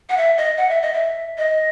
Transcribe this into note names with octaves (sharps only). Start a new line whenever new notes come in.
F#5
E5
D#5
F#5
E5
D#5
E5
D#5